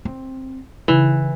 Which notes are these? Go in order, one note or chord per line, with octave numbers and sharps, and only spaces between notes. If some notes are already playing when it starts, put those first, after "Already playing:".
C4
C#3 E3